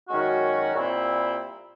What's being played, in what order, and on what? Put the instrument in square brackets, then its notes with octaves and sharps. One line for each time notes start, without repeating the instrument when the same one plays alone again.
[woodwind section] F#2 D#3 G#3 C#4 F#4
A#2 G3 C4 E4